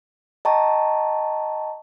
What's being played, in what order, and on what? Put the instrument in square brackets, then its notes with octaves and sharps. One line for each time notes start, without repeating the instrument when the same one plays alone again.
[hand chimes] D#5 G5 A5 A#5 C#6